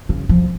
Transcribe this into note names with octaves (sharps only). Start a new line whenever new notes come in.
C#3
F3